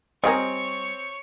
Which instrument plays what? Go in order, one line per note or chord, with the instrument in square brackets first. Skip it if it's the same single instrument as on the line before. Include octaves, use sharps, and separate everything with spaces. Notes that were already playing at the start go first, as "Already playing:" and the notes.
[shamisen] G3 G4 A#4 [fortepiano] C4 [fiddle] C#5 C#6 [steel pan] D#5 G#5